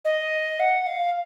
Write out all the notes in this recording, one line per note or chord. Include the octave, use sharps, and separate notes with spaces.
D#5
F#5
F5